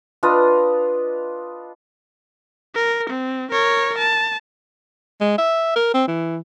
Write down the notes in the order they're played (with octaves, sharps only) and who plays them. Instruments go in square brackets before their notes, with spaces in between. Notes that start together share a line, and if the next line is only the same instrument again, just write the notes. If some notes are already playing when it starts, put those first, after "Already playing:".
[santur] D4 F4 B4 D#5
[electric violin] A#4
C4
A#4 C#5
A5
[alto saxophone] G#3
E5
A#4
C4
E3